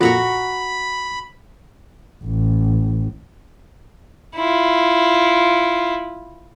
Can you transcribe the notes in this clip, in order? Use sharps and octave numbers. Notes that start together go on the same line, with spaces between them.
F2 A#2 F#4 A#5 B5 C#6
A1
E4 F4